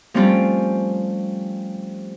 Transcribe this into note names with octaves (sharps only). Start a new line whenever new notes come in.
F3 G3 A3 C4 C#4 F4